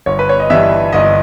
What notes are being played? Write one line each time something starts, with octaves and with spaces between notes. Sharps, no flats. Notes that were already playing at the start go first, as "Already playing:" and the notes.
G1 C#5
B4
C#5
D#5
G2 E3 G3 E5
G1 D#5